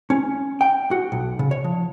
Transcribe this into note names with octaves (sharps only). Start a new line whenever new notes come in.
C#4
G5
F#4
B1
C#3
C#5
F3